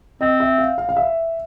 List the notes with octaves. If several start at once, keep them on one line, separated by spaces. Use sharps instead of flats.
C4 D#5
E5
F5
F5
F5
E5